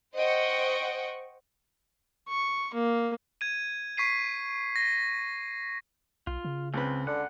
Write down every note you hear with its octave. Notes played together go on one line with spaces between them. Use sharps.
C5 D#5 F#5 G5 C#6
C#6
A#3
G#6 D#7
C#6 B6 C7 D#7
A#6
B1 F4
C#3
C#2 C4 B4
D3 F#5